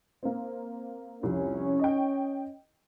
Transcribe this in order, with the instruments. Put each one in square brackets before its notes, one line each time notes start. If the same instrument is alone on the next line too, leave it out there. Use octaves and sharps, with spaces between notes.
[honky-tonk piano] A#3 C4
[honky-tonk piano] C2 F2 [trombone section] C#4
[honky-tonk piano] D#5 G5